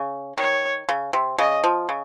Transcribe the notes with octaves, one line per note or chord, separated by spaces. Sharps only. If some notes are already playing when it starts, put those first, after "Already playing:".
Already playing: C#3
D#3 C#5
C#3
C3
C#3 D#5
F3
C#3